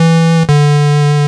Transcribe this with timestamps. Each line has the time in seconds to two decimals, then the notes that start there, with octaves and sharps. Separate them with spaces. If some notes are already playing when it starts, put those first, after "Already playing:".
Already playing: E3
0.49 D3